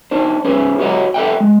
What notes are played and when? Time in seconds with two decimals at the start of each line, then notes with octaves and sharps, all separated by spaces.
0.11 D4 D#4 C5
0.45 C#4 G#4 B4 C5
0.78 E4 F#4 G4 C#5 D#5 F#5
1.14 A4 D5 E5 F#5 G5
1.40 G#3